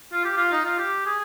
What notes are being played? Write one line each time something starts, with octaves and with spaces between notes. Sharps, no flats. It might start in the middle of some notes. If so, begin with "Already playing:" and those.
F4
G4
F4
D#4
F4
G4
G#4